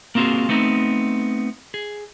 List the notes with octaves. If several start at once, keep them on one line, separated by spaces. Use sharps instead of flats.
A#3 C4 F4 F#4 G#4
A3 B3 C4 D#4
G#4